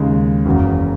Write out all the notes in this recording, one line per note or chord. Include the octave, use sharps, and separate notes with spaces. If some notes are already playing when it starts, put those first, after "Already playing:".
Already playing: D#2 C#3 G#3
F#1 E2 C#3 F#3